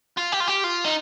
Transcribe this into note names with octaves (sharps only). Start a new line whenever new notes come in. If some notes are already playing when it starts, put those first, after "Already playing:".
F4
G4
F4
G4
F4
D#4